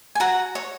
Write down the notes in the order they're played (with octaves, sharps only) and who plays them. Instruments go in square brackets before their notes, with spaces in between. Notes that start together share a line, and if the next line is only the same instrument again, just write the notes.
[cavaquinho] G#5
F#4 F#5 A#5
C#5